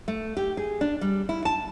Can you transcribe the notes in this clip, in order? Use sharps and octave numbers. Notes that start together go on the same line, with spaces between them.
A3
G4
G#4
D4
G3
E4
A5